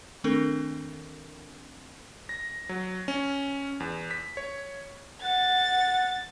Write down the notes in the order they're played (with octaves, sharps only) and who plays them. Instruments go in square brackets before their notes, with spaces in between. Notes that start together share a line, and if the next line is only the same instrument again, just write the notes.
[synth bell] D#3 A3 C4 D4 A4 A#4
[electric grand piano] A#6
F#3
C#4
E2
B6
C#5
[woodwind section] F#5 [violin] A6